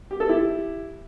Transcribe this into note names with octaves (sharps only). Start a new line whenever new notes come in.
G4
A4
E4 G4